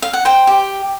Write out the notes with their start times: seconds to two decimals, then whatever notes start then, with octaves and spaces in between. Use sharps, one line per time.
0.02 F5
0.13 F#5
0.25 C5 G5
0.47 G4